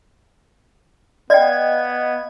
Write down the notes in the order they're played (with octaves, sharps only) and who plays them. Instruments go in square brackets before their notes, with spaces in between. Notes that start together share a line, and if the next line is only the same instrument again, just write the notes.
[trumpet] B3 [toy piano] D5 G5 [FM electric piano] D#5 F5 G#6